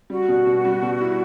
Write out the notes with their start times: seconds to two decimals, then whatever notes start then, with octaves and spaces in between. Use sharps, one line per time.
0.10 G3 F#4
0.28 B2
0.46 B2
0.65 G3
0.82 B2
1.01 E4